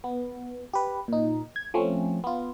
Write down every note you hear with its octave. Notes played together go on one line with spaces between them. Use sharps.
B3
G4 B4
A#2 D#4
G#6
F3 A3 C4 C#4
B3 F4